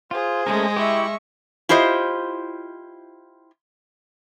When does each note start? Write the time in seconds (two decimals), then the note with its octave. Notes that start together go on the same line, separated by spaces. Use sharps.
0.11 F4 G#4 C5
0.47 G#3 A3 C#4 A#4
0.76 E4 G4 E5 C#6
1.69 E4 F4 G4 C5 D#5